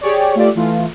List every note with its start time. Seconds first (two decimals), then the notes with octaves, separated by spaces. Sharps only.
0.01 G4 G#4 C#5 D5
0.35 A3 F4 G4 A4 D5
0.55 E3 A3 F4